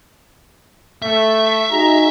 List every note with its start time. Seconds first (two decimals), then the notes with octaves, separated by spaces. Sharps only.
1.02 A3 E5
1.71 D#4 F#4 G#4 A#5